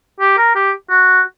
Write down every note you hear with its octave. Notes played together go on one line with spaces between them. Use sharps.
G4
A#4
G4
F#4